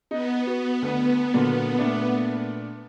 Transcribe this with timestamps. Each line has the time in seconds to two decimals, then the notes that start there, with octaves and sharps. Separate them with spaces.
0.11 B3 D#4
0.47 F#4
0.82 D2
1.34 A#2 D3 F#3
1.78 A#2 A3 D4